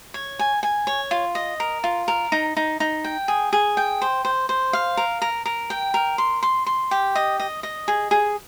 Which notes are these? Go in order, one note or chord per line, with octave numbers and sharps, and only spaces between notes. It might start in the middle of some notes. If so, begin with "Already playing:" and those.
C#5
G#5
G#5
C#5
F4
D#5
A#4
F4
A#4
D#4
D#4
D#4
G5
G#4
G#4
G5
C5
C5
C5
F5
A#4
A#4
A#4
G5
A#4
C6
C6
C6
G4
D#5
D#5
D#5
G#4
G#4